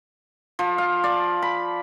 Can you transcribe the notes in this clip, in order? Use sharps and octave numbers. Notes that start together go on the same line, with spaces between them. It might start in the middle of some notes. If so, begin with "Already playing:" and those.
F3
F5
D5
B5